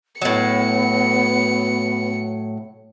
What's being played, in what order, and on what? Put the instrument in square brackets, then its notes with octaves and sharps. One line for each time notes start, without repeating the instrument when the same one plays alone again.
[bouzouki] A2 F#3 [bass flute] B3 [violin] C#7